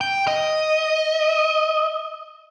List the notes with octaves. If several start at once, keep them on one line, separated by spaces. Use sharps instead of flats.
G5
D#5